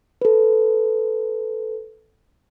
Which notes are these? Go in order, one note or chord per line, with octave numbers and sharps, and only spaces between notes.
A4 B4